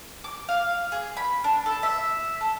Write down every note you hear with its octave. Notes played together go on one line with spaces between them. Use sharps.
D6
F5
G#4
B5
D4
A4
E5
A4